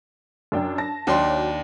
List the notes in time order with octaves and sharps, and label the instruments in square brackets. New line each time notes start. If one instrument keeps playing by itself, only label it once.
[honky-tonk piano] F#2 D4 G5
A5 A#6
[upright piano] D#2 D4 C6 [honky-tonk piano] F#3